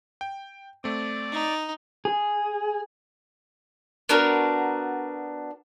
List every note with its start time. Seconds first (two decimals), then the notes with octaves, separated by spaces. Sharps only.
0.21 G5
0.84 A3 C4 D5
1.32 D#4
2.05 G#4
4.09 B3 D4 F#4 A#4